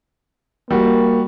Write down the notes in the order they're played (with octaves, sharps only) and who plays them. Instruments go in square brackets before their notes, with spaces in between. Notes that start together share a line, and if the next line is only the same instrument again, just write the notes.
[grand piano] G3 F#4 [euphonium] A#3